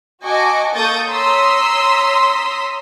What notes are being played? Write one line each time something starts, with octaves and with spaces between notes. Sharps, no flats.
F#4 D#5 G#5 A5 C#6 D6
A#3 A4 C#6 D#6 G6 A6
C#5 A#5 C6 D#6 E6 B6